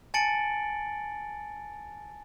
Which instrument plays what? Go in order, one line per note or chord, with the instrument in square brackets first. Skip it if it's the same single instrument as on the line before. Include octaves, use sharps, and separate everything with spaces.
[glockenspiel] G#5 A5 A6 C#7 D7 F#7